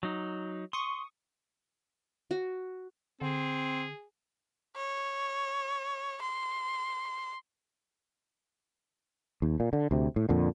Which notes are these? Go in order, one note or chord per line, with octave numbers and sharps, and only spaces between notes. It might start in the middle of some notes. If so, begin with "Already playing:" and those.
F#3 D#4
C6 C#6 D#6
F#4
D3 C4 G#4
C#5
C6
D#2
A#2
D3
D2 C3
A2
F2 A#2 D3